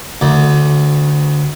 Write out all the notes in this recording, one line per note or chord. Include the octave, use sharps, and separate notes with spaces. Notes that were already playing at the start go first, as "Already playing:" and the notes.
D2